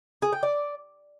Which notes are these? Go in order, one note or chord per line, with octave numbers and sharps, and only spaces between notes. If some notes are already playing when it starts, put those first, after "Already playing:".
G#4
G5
D5